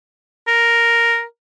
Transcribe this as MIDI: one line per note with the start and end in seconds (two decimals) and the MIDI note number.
0.48 1.23 70